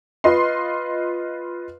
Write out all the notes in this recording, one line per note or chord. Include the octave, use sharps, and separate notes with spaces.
F4 B4 D#5 C6